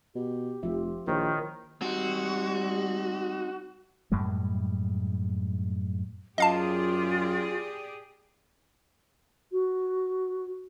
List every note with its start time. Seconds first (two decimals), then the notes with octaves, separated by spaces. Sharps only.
0.15 B2 G4
0.63 F1 F3 F4 E5
1.07 A#1 D#3 E4 C5 C#5
1.82 G3 C4 D#4 F#4
4.12 F#2 A2 G3 G#3
6.38 F#2 F4 G4 G#4 D5 D#5 F5 A5
9.52 F#4